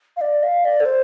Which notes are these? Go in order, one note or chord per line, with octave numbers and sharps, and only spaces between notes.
F5
D5
F5
D5
A4
C5